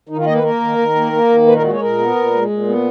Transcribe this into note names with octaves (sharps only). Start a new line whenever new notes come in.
D#3 D#4
F4
A#3 D#5
B4
A#3 A#4
D#3
D#3
A#3
A#3
D#3
A#2 B4
A#4
G#3 F#4
C#5
A#2 A#4
B3
A#2
G#3
A#2
B3